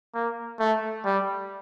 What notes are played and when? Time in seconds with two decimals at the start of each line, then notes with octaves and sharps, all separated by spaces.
0.14 A#3
0.59 A3
1.05 G3